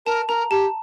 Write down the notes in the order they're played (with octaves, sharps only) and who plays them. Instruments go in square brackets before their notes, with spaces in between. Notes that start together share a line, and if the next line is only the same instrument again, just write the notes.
[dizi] A#4 [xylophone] A5
[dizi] A#4 [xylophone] A#5
[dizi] G4 [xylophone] A5